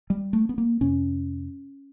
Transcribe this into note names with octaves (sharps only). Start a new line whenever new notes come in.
G3
A3
B3
A#3
F2 C3 C#4